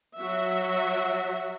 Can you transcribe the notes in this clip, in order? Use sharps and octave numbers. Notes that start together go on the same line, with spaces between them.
F#3 F#4 E5